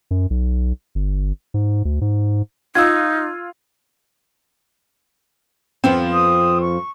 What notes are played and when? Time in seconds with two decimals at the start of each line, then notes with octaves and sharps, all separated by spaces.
0.11 F#2
0.30 B1
0.95 G1
1.54 G#2
1.85 D2
2.01 G#2
2.75 D#4 F4 E6 G#6
5.84 F2 F3 B3 C4
6.12 D#6
6.60 C#6